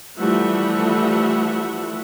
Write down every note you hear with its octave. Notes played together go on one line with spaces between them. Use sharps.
E3 F3 G3 A3 E5 F#5